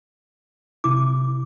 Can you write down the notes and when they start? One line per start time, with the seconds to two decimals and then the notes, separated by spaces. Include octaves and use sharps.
0.84 C3 E4 D6